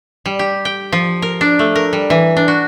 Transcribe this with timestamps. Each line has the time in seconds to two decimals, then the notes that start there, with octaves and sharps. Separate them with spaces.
0.26 G3
0.39 G4
0.65 G5
0.92 F3
1.22 A#4
1.41 D4
1.59 A3
1.75 A#4
1.93 G3
2.10 E3
2.37 D4
2.48 F#4